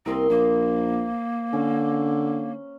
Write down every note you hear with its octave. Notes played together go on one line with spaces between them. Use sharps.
C2 A#3 C4 D#5 C6
A#1 A#3 C5 D6
D3 C#4